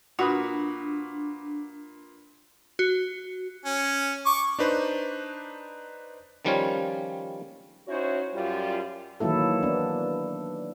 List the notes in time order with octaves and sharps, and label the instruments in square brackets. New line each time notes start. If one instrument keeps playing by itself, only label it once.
[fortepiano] A#2 B4 D#6 [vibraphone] D4 [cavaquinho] F#4
[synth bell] F#4
[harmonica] C#4
C#6 D6
[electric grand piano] D4 D#4 B4 C5
[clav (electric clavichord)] D#3 F3 G3 C#4 F4 C#5
[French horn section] C#4 D#4 E4 F#4 C5 C#5
F#2 G3 F4
[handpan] D#3 E3 F#3 A#3 E4 A4
B3 D4